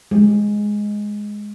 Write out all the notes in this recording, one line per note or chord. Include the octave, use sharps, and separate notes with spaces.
G#3